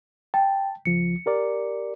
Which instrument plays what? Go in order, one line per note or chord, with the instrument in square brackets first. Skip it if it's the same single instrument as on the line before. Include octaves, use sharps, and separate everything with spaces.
[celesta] G5 [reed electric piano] A5
[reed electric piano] C#2 F3 [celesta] C#7
[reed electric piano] G4 A#4 D5